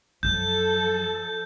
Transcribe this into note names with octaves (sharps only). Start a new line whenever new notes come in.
F#2 F3 F#3 A4 G6